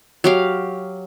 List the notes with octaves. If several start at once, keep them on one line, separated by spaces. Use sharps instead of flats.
F#3 G4 F5